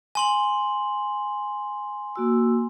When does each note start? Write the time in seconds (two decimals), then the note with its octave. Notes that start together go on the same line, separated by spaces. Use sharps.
0.15 G#5 C6 F#7
2.16 A#3 F#4 E6